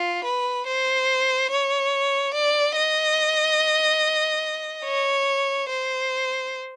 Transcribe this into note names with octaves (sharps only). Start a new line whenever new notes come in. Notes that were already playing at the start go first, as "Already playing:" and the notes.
Already playing: F4
B4
C5
C#5
D5
D#5
C#5
C5